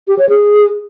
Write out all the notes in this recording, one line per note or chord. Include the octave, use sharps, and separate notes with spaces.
G4
C#5
G#4